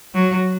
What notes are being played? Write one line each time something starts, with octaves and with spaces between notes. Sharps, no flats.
F#3